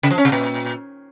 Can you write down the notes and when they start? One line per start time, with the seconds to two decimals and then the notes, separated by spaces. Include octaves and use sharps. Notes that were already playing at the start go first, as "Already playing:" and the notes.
0.03 C#3
0.10 F3
0.18 C#4
0.25 C3
0.32 A#2